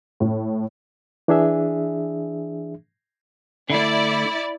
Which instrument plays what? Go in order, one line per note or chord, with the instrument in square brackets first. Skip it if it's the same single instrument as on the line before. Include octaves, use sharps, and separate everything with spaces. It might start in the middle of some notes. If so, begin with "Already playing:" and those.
[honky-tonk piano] A2
[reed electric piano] E3 D4 G#4 E5
[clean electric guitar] D3 A3 [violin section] E4 D5